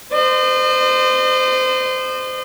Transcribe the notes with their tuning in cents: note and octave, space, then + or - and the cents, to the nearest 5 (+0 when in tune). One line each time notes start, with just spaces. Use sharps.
C5 -20 D#5 -40